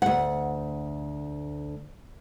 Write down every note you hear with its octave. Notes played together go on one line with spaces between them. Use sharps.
D2 F#5